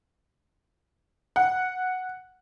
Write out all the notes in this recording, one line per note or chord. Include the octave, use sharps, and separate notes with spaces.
F#5